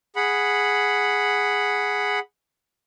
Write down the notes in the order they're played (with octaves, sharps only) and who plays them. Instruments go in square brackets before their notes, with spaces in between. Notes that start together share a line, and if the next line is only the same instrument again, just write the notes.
[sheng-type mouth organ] G#4 F#5 B5